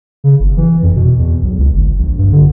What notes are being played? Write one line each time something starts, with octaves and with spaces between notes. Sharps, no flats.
C#3
G1
E3
F2
B2
E2
B1
C#2
G1
A#1
G2
D3